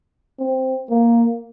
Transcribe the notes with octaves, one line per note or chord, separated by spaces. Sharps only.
C4
A#3